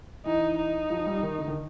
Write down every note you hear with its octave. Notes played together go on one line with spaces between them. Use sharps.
E3 D#4
D#4
F3
G3
D#3
D3
D#3